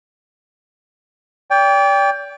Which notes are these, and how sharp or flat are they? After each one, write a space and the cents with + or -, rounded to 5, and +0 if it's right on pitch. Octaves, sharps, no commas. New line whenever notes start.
D5 -35 G5 +15